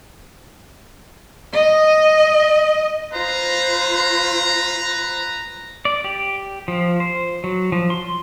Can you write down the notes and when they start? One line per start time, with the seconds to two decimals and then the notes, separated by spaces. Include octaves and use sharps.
1.53 D#5
3.12 F4 B4 C5 A#5
5.85 D5
6.04 G4
6.68 F3
7.00 C5
7.44 F#3
7.72 F3
7.90 C6